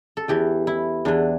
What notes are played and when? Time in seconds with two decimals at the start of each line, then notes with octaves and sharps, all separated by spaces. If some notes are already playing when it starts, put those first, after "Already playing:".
0.17 A4
0.28 E2 E3 G4
0.67 E4
1.05 E2 E3 D4